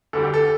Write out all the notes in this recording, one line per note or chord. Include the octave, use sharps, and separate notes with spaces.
D2 D3 G3 A4
G4
A4